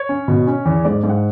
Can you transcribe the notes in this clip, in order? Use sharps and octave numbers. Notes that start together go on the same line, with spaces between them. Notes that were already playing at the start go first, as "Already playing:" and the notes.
Already playing: C#5
C#4
B2
C#4
E2
G#2 D5
G#2
F#5